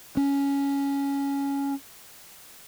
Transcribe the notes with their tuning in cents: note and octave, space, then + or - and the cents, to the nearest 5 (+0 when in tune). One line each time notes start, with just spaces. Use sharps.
C#4 +10